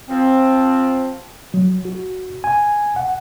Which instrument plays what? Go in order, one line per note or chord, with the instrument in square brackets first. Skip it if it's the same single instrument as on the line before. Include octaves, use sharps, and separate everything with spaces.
[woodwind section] F3 C4
[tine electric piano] F#3
F#4
G#5
F#5